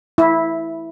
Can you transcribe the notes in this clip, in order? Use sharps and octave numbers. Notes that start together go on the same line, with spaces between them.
E4